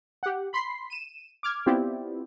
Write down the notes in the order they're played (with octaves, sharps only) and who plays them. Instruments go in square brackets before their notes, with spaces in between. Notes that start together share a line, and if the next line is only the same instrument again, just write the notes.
[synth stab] G4 F#5
B5 C6 B6 C7
D#7 E7
D6 F6 G#6
B3 C4 E4 F4 G4 D5